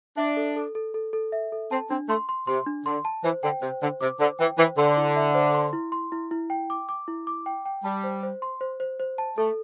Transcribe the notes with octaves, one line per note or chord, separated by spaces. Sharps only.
D4 E5
A4
A4
A4
A4
A4
E5
A4
C4 A5
C4 D4
A3 C6
C6
C3 C6
D4
D3 C6
A5
E3 C5
D3 G5
C3 C5
D3 C5
C3 D6
D3 C5
E3 G5
E3 C5
D3 C6
E4
E5
C5
C6
E4
C6
E4
E4
G5
D6
D6
E4
D6
G5
G5
G3 A5
C5
C5
C6
C5
C5
C5
A5
A3 A4